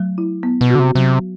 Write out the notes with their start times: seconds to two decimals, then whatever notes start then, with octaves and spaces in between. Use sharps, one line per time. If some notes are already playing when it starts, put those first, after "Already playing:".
Already playing: F#3 A3
0.18 E4
0.43 B3
0.61 B2
0.70 D3 F#4
0.79 C3
0.95 C3 F#3